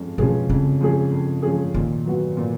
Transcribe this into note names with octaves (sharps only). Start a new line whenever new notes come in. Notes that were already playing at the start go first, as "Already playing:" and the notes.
Already playing: F2 F3 G#3 C#4
B2 F3 G#3 C#4 G#4
F2 C#3
F3 G#3 C#4 G#4
F2
F3 G#3 C#4 G#4
A#2 D#3
F#3 B3 F#4
A#2